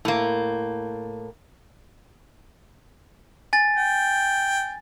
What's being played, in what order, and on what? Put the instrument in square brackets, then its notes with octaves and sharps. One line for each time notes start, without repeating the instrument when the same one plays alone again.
[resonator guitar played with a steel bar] A2 A#3
[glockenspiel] G#5 A6
[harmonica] G5